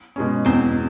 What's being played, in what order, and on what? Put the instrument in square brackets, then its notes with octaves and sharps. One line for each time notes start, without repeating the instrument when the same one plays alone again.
[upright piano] B2 G#3 C#4
[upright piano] E2 [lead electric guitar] C4